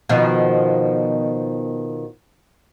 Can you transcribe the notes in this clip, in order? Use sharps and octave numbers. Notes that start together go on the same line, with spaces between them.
B2 D#3 F3